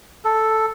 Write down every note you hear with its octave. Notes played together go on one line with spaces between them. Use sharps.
A4